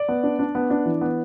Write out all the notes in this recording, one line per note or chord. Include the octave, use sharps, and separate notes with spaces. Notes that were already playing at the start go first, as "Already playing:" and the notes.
Already playing: D5
B3
D4
D4
B3
D4
E3
B3